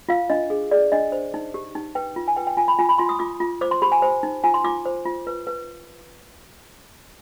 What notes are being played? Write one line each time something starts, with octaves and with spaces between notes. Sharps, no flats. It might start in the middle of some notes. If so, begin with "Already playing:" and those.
F4 F5
D4 D#5
G#4
G#4 D5
D4 D#5
C5
D#4
G4
D#4
B4 G5
F4
G#5
B4 G5
G5
F4 G#5
B5
F4 G#5
B5
F4 C6
D#6
F4 D6
F4
C5 D6
C6
G4 B5
G#5
C5
D#4
F4 G#5
C6
F4 D6
C5
F4
B4
B4